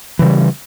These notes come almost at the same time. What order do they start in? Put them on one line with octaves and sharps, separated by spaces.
E3 C#3 G3